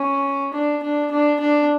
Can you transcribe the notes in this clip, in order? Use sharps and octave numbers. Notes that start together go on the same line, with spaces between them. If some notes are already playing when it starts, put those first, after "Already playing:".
Already playing: C#4
D4
D4
D4
D4